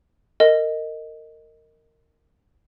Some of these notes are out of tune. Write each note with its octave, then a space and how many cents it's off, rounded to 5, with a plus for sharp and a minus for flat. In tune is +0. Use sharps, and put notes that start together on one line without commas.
A#4 -25 D#5 +0